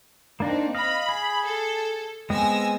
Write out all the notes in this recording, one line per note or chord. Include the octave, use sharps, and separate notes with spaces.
A#3 C4 D4 D#4
D#5 F5 B5
G#4
A4
G#3 B3 C4 G#5 E6 A#6